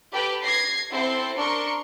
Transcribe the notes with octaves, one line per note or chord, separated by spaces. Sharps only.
G4 A4 B4 G5 B5
G#6 A#6 C7
C4 E4 A4 C5 C7
D4 A#4 C6 C#6 C#7